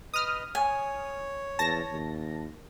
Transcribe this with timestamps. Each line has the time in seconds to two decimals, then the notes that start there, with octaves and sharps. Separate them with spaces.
0.14 B4 D#5 D#6 F6
0.55 C#5 G#5
1.59 E2 A5 A#6
1.92 D#2